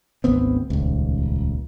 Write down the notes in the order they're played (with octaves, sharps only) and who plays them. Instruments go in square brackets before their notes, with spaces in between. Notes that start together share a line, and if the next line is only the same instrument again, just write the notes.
[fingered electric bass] G#1 D2 B3 C4
D#1 C#2